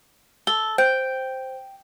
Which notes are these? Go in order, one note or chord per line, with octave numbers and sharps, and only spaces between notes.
A4 G7
C5 G5